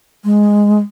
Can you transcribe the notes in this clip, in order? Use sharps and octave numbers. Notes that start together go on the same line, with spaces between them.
G#3